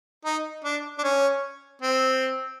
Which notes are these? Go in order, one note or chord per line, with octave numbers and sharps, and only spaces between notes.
D#4
D4
D4
C#4
C4